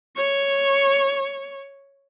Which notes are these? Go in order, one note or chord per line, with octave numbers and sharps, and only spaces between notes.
C#5 C#6